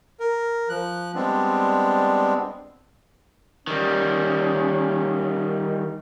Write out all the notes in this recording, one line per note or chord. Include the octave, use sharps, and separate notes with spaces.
A#4
F3 F#6
G3 G#3 B3 C4 D4
D#3 G3 C#4